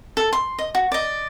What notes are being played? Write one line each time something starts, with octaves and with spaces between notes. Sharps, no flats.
A4
C6
D#5
F#4
D5 D#5